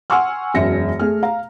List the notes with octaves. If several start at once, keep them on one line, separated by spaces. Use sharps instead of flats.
F#5 G#5 C6 C#6 E6 F6
E1 F#2 E5 A#6 C#7
A3 G#4 F6
F5 A#5